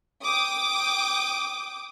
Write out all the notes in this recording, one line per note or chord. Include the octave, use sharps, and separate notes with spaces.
G5 D6 D#6